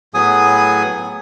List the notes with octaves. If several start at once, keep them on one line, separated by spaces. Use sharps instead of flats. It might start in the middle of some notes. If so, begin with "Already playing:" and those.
A2 F#3 B3 G#4 G#5 D#6